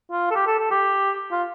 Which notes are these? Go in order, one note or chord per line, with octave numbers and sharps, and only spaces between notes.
F4
A4
G4
A4
A4
G4
F4